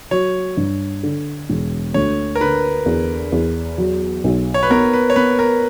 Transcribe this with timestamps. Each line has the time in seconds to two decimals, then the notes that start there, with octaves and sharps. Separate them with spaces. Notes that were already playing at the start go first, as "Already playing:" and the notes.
0.11 F#3 C#5
0.57 G2
1.03 D3
1.50 E1
1.94 D2 C#5
2.36 A#4
2.41 D3 B4
2.86 E2
3.32 E2
3.78 F#3
4.24 B1
4.54 C#5
4.63 B4
4.70 B3 A#4
4.93 B4
5.10 C#5
5.16 B3 B4
5.39 A#4